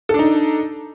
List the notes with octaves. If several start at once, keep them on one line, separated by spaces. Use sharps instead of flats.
D4 D#4 A4